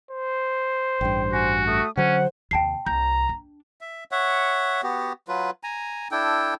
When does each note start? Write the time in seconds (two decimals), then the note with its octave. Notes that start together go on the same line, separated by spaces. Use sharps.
0.11 C5
1.01 A1 G2 G5
1.33 F#4 G#5
1.67 A3 D#6
1.97 D3 F#3 C#4 C5 F#5
2.51 D#2 C3 G5 A5 C7
2.86 C2 A#5 G6
3.29 D4
3.81 E5
4.12 C#5 E5 F#5
4.83 B3 F#4 G4
5.28 F#3 F4 B4
5.63 G#5 A#5
6.11 D4 E4 A4 G5